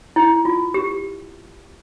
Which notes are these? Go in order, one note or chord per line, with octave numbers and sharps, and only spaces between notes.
E4
F4
G4